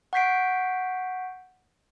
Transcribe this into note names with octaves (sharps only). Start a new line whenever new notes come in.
F#5 C#6 G6 B6 C7 D7